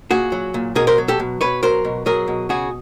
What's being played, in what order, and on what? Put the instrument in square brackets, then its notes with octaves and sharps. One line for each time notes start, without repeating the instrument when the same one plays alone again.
[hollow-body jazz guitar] A#2 F#4 G#4
F#3
A#2
B2 G#4 A#4
A#4 C5
F#3
G4 A4
B2
B2 B4 C#5
F#3 A#4 C5
B2
F#3 G#4 A#4
B2
C#3 F#4 G#4